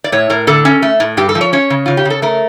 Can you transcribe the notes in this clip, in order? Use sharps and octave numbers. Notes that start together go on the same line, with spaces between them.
D5
A2 C#5
A2 A#4
D3 A4
C#4
A3
A2
G2 G4
A4
F3
C#5
C#4 C#5
C#3
C#3 F4
G4
C#3
A4
A3 A#4